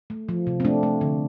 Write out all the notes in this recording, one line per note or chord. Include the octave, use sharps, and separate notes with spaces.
A3
F3
C3
C4
A3 D4
A3
D3